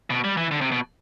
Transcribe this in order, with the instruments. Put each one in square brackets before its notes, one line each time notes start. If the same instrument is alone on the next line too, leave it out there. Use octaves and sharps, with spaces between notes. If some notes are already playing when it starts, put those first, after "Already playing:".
[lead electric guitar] B2
G3
E3
D3
C3
B2